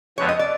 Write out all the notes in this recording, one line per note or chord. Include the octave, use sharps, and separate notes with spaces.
F2 D3 F3 G#3 B3 C#5
D#5
D5